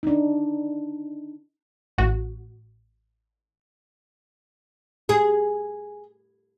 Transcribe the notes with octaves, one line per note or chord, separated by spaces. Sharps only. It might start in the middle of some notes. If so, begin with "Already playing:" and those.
D4 D#4
A1 F#4
G#4